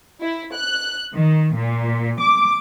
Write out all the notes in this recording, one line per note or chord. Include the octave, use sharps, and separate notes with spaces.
E4
F#6
D#3
A#2
D6